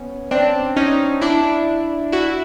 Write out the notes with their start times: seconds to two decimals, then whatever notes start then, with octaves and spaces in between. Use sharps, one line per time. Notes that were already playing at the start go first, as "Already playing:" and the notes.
Already playing: B3 C#4
0.31 C4 D4
0.76 C#4 D#4
1.21 D4 E4
2.12 E4 F#4